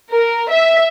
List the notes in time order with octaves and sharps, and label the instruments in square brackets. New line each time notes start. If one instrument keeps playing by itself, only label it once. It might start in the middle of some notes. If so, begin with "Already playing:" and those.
[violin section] A#4
E5